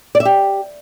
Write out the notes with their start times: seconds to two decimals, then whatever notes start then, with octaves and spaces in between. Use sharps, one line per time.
0.15 D5
0.20 E5
0.25 G4